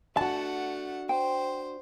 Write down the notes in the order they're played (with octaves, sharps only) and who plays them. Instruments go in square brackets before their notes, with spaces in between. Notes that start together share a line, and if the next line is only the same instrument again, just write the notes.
[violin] A3 F#5 [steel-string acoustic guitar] D4 F#4 [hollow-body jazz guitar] A5
[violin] C5 [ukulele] G5